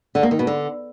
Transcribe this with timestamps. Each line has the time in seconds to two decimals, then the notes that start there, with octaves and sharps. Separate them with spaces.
0.15 D3
0.23 A#3
0.31 D#3
0.39 B2
0.47 D3